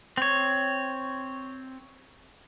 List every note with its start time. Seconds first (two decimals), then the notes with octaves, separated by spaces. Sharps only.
0.17 C4 C#5